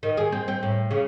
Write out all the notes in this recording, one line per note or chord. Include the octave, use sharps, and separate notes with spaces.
D#3
G#4
C4
C4
A2
C#3